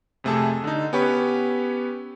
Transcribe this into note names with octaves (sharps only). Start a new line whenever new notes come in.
F2 C3 A3 G#4 A5 E6
D3 D#4
B3 C#4 G4 B4 C#5